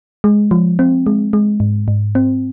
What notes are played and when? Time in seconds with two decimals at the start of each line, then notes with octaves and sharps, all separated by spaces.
0.24 G#3
0.51 F3
0.79 C4
1.06 G#3
1.33 G#3
1.60 G#2
1.88 G#2
2.15 C4